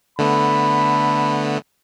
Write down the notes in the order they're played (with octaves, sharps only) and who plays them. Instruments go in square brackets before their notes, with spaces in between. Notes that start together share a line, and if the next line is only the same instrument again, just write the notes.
[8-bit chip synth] D3 A3 B3 [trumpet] B5